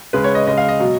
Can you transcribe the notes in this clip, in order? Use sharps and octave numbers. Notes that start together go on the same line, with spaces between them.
C#3 G#3 B4
C#5
D#5
C#3 G#3 D#5
F5
D#5
B2 F#3